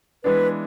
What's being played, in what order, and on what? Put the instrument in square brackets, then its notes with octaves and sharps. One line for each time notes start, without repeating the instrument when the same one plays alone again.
[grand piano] E3 G#3 B3 D4 [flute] B4